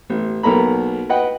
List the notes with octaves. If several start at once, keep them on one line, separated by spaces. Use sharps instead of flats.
A1
B1 A#3 A4 A#5 B5
B4 D#5 F#5 G5